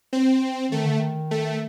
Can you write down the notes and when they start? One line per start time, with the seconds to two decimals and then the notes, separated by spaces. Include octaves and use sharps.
0.13 C4
0.72 D#3 A3
0.85 D3
1.00 D#3
1.31 A3